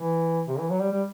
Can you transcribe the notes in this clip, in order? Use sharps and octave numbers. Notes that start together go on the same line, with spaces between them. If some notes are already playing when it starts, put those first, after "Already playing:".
Already playing: E3
C3
E3
F#3
G3
G3